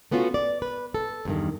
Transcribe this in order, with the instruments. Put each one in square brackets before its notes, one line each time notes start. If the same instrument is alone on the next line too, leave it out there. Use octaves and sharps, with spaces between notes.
[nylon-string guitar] A3 B3 C#4 F4 F#4
D5
B4
A4
E2 G2 D#3